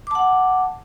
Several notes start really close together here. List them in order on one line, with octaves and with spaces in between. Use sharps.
D6 A5 F#5